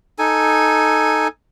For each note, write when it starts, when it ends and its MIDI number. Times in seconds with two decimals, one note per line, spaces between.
0.19 1.28 63
0.19 1.28 69
0.19 1.28 80